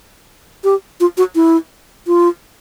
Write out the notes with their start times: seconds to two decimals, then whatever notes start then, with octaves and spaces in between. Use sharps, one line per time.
0.64 G4
1.00 F4
1.17 F#4
1.35 E4
2.07 F4